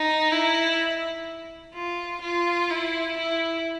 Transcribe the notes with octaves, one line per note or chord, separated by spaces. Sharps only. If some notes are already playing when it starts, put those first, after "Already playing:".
Already playing: D#4
E4
F4
F4
E4
E4